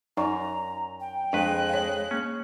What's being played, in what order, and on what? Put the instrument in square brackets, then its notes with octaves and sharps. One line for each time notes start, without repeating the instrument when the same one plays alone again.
[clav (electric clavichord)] F#2 [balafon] D#4 D5 C#6 [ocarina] A#5
[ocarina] G5
[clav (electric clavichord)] F2 B4 [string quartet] G#3 F#6 [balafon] D4
[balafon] C#5 F5
[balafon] A#3 [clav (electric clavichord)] C#4